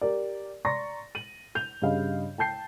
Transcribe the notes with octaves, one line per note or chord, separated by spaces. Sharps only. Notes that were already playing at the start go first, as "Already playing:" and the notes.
G4 A#4 D5
D5 A#5 C6 C#6 A6 A#6
D#7 F#7
G6 F7
G2 C#3 D#5 F5 B5
G5 A5 G6 C7